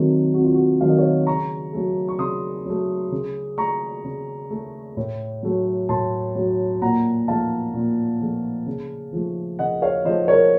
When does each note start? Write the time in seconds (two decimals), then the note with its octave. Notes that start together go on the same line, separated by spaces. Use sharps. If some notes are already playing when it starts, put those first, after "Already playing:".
Already playing: C3 D#3 F#3 A3
0.34 C3 F#4
0.45 F4
0.54 F#4
0.81 D#3 F#3 A3 F5
0.89 D#5
0.98 C#5 F5
1.27 C#3 A#5 C#6
1.73 F#3 A3
2.09 C#6
2.19 C#3 C6 D#6
2.66 F#3 A3
3.12 C#3
3.57 A3 A#5 C#6
4.04 C#3
4.50 A3
4.97 A2
5.43 F#3 A3
5.89 A2 A5 C6
6.35 F#3 A3
6.81 A#2 F#5 A#5
7.28 F3 A3 F5 A5
7.74 A#2
8.21 F3 A3
8.66 C#3
9.13 F3 A3
9.59 C#3 D#5 F#5
9.82 C#5 F5
10.05 F3 A3 C5 D#5
10.28 A#4 C#5